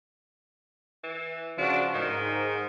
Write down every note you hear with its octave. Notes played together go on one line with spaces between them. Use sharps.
E3
C#3 F3 D4 F#4
G#2 D#3